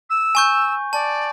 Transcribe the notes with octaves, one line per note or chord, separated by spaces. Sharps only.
E6
G#5 C#6 G6
D5 A5